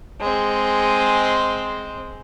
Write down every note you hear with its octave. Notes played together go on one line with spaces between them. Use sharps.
G#3 C4